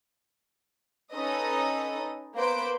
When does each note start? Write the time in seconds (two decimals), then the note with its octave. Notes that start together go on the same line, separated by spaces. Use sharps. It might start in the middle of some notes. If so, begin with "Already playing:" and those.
1.13 C#4 D#4 A4 B4 D#5 D#6
2.36 A#3 B3 B4 C5 G6 D7